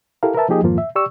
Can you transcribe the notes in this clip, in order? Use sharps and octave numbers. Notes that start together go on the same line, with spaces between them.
E4 G4 A4 A#4 F5
A#4 B4 E5 A5
F3 A#3 D#4 G4 G#4 D#5
F2 G#2 D#3 F3 A#3 F4
E5
G4 D5 C#6 E6